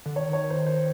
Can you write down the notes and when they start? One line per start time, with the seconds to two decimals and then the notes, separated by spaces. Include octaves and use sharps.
0.06 D3
0.16 D#3 C#5
0.33 C#5
0.50 C5
0.67 C5